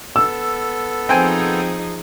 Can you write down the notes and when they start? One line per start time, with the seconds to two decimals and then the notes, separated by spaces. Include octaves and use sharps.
0.16 B3 A4 E6
1.09 F3 C4 D#4 G#4 G5 G#5